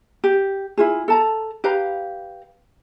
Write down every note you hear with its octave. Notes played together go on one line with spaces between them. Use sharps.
G4
E4 F4 G#4
A4 A5 A#5
G4 B4 F5 A#5